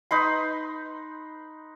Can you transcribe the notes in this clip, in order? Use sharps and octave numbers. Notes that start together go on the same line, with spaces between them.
D#4 B4 C6